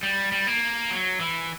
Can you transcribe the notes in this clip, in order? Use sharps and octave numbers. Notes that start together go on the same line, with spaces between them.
G3
G3
A#3
F#3
E3